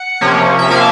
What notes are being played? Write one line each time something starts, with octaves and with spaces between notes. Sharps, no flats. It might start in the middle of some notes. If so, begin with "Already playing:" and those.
Already playing: F#5
C3 F3 A#3 C#4
E5
C3 F3 A#3 C#4 F5